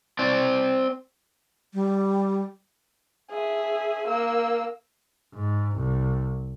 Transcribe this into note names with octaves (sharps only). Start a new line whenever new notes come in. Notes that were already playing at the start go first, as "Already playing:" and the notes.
C4 D5
G3
G#4 E5
A#3 E6
G#2
C2